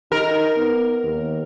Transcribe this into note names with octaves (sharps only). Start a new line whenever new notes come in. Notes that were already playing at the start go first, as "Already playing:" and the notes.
D#4 A#4
B3
D#2